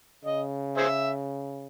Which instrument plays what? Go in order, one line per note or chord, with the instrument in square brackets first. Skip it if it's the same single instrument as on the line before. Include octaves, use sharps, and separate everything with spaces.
[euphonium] C#3 [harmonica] D#5
[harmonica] G#4 C5 E5